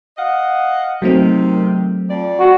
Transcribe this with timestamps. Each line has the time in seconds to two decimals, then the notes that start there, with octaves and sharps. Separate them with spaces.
0.18 D#5 F5 F#5
1.02 C3 D#3 F#3 A3 C4
2.10 F2 D5
2.40 F#4